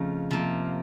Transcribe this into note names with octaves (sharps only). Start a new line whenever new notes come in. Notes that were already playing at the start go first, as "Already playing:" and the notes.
Already playing: F2 C#3 F3 A3 D#4
C3 F3 A#3